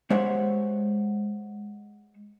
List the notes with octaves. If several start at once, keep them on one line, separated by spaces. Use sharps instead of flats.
G#3 G4 C5 C#5 E5 F#5